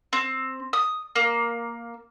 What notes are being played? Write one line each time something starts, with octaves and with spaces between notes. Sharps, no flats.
C4
D#6
A#3